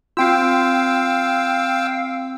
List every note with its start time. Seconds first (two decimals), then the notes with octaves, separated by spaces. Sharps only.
0.17 C4 F4 F5 G5 E6